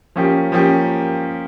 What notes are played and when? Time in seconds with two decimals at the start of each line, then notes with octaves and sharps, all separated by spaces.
0.16 F3 A#3 C#4 G4
0.52 F3 A#3 C#4 G4